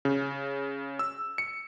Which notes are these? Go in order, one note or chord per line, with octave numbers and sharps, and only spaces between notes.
C#3
E6
C#7